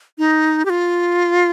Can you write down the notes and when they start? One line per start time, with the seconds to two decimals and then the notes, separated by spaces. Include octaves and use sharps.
0.18 D#4
0.65 G4
0.70 F4